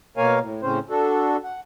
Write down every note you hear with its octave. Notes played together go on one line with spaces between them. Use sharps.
B2 A#3 A#4 C#5 F5 G#5
A2
A2 C#3 C4 C#4 C5
D4 F#4 A4
F#5